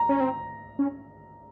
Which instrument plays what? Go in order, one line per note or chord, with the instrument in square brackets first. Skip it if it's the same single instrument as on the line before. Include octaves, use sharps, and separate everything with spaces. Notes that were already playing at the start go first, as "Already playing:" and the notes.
Already playing: [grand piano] A#5
[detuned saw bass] C#4
C4
C#4